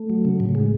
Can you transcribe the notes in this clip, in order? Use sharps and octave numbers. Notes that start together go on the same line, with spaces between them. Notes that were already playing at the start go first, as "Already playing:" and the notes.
Already playing: A3
F#3
C#3
A2
G#3